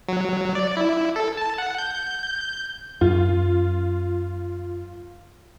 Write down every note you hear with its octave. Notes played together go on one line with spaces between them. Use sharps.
F#3
D5
E4
A4
A5
F#5
G6
G6
F#2 F4